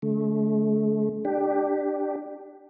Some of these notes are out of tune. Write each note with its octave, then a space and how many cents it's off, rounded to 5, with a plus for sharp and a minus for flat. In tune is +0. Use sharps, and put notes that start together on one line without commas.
D3 -45 A3 -40
D4 +15 G4 +0